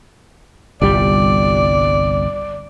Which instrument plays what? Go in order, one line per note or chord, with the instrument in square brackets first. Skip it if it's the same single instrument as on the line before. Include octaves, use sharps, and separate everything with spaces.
[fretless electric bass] G1 C2 G3 [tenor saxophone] D5